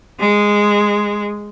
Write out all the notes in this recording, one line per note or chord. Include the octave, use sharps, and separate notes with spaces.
G#3